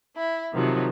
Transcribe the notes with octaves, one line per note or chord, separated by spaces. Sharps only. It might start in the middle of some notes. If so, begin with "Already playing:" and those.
E4
C3 D#3 F3 F#3